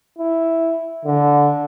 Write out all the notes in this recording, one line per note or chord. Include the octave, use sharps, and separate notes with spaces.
E4
D3